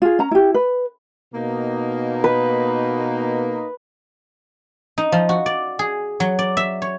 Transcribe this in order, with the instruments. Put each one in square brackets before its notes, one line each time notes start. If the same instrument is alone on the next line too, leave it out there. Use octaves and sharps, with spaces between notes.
[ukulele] F4 G#4
C#4 A#5
E4 G4
B4
[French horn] B2 [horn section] A#3 D#4
[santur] B4
[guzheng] D#4
F3
F#4
D5
G#4
F#3
D5
E5
C#5